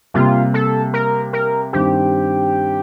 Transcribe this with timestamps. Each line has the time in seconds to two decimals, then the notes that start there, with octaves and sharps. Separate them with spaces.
0.14 C3 G3 A#3 F4
0.54 A4
0.94 A#4
1.33 A#4
1.73 G2 D#3 G3 C4 G4